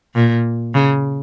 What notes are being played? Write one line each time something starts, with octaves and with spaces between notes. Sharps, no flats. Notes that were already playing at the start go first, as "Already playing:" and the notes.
A#2
C#3